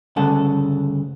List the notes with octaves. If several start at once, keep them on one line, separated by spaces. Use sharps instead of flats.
D2 G2 C#3 A4 F#5